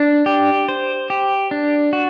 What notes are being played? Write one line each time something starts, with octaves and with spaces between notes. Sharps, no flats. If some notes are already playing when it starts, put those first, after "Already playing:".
Already playing: D4
G4
C5
G4
D4
F#4